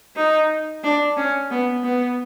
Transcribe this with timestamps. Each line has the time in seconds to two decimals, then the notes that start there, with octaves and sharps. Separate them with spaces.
0.16 D#4
0.83 D4
1.17 C#4
1.51 B3
1.84 B3